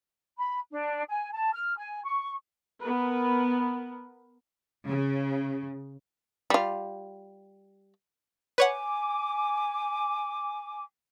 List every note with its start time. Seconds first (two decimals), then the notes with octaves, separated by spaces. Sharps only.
0.37 B5
0.71 D4
1.08 G#5
1.32 A5
1.53 F6
1.78 G#5
2.04 C#6
2.81 B3 A#4 B4
4.86 C#3
6.50 G3 F4
8.58 B4 C#5 F#5 G#5 D6